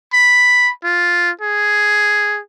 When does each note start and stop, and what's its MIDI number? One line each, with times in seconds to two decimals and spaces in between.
0.13 0.71 83
0.84 1.30 65
1.41 2.40 68